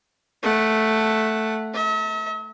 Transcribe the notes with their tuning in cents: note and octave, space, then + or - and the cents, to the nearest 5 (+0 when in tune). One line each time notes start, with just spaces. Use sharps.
A3 +0 F#5 +0
E5 -45 A5 +45